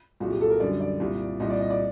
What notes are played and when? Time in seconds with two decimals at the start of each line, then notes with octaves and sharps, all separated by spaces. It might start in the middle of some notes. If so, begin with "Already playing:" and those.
0.20 C2 A#2 F#3 F#4
0.31 G4
0.41 A4
0.50 A#4
0.60 F#2 D3 G3 D5
0.80 D5
1.00 C2 A#2 G3
1.40 C2 A#2 G3 D#5
1.50 D5
1.60 D#5
1.70 D5